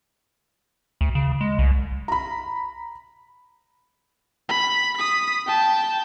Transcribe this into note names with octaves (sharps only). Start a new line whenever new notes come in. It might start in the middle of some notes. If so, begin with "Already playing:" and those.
D2
C#3
G#3
C2
A#5 B5
B5
D#6 B6
G5 A5